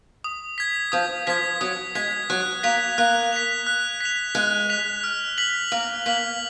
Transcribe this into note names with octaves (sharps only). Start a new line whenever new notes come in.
D#6
G#6 B6
F3 D#6
F3 G#6 B6
F#3 D#6
G#3 G#6 B6
F#3 F#6
A#3 B6 F7
A#3 F#6
B6 F7
F#6
B6 F7
G#3 F#6
B6 F7
F6
B6 F#7
A#3 F6
A#3 B6 F#7